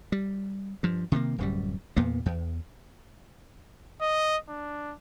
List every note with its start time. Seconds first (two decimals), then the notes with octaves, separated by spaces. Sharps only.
0.12 G3
0.83 G2 F3
1.12 C3 D#3 F3 A#3
1.38 D1 F#2 G3
1.97 E2 A#2 A#3 B3
2.26 E2
4.01 D#5
4.48 D4